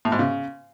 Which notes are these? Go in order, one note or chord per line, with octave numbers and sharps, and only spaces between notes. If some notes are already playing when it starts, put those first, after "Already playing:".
A2
G#2
C#3